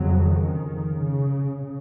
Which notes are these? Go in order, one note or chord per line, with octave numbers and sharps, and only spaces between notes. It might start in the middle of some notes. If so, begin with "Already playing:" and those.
Already playing: F2 C#3 F#3
D#3
C#3